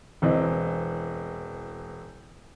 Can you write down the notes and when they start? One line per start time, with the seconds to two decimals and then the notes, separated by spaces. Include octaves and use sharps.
0.22 E1 E3 C4 D#5